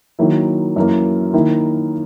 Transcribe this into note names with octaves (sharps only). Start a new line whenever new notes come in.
D#3 F#3 A#3 E4
F#2 E3 A#3
D#3 A#3 E4